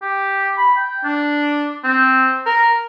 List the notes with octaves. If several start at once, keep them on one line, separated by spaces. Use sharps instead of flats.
G4
B5
G5
D4
C4
A#4